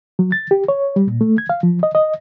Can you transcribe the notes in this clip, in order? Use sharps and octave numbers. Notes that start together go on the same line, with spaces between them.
F#3
A6
G4
C#5
G3
A#2
A3
G#6
F5
F3
D#5
D#5